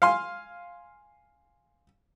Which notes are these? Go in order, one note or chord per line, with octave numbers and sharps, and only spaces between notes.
F5 G#5 C6